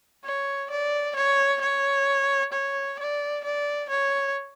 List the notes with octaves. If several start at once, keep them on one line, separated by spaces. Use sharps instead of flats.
C#5
D5
C#5
C#5
C#5
D5
D5
C#5